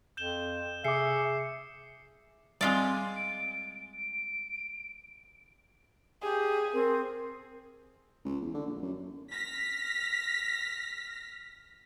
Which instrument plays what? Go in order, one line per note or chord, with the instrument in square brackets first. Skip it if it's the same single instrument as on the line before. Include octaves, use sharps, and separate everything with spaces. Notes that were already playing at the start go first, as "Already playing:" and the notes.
[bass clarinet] F2 [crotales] G6 E7 G7
[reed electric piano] C3 D6 [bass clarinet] G#4 [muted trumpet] E5 [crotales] C7 C#7
[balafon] G3 C4 [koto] G#3 F4 D5 [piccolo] G#5
[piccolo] D7
D7
[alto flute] G4 [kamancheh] G#4
[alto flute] C4 [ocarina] A#4
[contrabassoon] C#2
E2
D3
A#1
F#2
[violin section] F6 A#6 B6